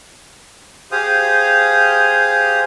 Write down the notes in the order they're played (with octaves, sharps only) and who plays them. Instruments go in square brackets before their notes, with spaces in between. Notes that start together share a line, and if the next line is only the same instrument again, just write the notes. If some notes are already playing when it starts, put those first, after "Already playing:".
[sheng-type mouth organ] G4 G#4 C5 F5 D#6